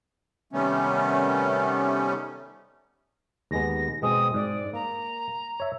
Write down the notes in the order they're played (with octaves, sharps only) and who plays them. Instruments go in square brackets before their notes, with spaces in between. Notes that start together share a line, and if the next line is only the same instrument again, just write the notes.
[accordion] C3 D#3 G3 A3 B3 C#4
[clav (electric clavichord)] D#2 G#3 B3 [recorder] A#6
[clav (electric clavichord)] B2 G#3 C4 [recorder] D#6
[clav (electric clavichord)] G#2 [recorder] D5
[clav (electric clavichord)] A#3 [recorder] A#5
[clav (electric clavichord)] C#5 E5